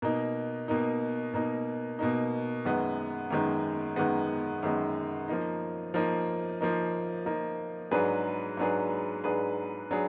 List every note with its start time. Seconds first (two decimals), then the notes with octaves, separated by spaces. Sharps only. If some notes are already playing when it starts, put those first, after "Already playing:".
0.02 B2 A#3 D#4
0.68 B2 A#3 D#4
1.34 B2 A#3 D#4
1.99 B2 A#3 D#4
2.65 F#2 D#3 G#3 B3
3.31 F#2 D#3 G#3 B3
3.96 F#2 D#3 G#3 B3
4.63 F#2 D#3 G#3 B3
5.28 F3 A#3 D#4
5.94 F3 A#3 D#4
6.61 F3 A#3 D#4
7.26 F3 A#3 D#4
7.91 G#2 F#3 D4 G#4 B4
8.57 G#2 F#3 D4 G#4 B4
9.24 G#2 F#3 D4 G#4 B4
9.91 F#3 D4 G#4